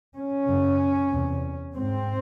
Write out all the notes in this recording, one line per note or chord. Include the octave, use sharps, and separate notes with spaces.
C#4
F#2 C#3
E2 C3
G#2 C4